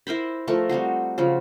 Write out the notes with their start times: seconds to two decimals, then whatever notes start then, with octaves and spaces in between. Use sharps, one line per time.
0.07 E4 A#4 C5 B5
0.47 F3 A3 A#4 C#6
0.69 G3 C4 D#4 F#4
1.18 C#3 F3 F#3